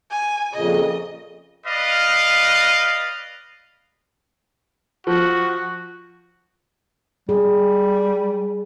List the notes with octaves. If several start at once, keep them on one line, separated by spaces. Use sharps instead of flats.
G#5
F2 A#2 C#3 D#5
B4 D5 D#5 F5
F3 F#4
G3 G#4